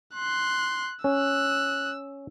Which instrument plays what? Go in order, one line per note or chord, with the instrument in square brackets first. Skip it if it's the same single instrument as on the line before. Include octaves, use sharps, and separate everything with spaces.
[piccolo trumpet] C6 [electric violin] F#6
[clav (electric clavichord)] C#4 [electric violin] E6 [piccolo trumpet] F#6